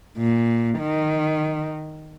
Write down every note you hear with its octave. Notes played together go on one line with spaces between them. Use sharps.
A#2
D#3